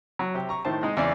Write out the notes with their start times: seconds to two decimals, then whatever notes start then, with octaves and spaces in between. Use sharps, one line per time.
0.19 F#3
0.34 C3 G4
0.49 A#5 C#6
0.65 A2 D#3 C5 A5
0.83 G#3 D#4
0.97 E2 C#3 D5 E5